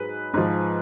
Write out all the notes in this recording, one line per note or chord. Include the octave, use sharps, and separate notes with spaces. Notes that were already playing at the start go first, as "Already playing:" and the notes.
Already playing: G#2 F#3 G#4 B4
G#2 F3